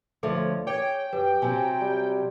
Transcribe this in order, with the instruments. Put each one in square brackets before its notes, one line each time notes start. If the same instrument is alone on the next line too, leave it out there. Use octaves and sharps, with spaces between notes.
[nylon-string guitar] D2 F3 C#5 [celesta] A4 E5
[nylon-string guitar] G#4 C#5 [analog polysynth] G5 [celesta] D6 G#6
[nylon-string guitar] F#2 [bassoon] G4 [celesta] B4
[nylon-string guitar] C3 F#3 C4 [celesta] G#5
[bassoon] G3